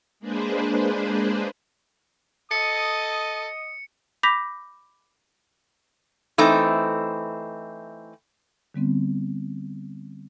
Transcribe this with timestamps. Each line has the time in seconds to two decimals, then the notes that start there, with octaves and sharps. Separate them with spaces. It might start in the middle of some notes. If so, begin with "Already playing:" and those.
0.20 G#3 A#3 D4 G#4 B4 C5
2.51 A4 D#5 D#6 C#7
4.23 B5 D6 G6 A#6 B6 F7
6.38 E3 A3 C4 D#4
8.74 D3 G3 B3 C4